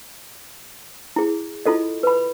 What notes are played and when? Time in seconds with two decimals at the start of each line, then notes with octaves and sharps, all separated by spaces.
1.16 E4 G#4
1.66 E4 F4 A4 D#5
2.03 B4 B5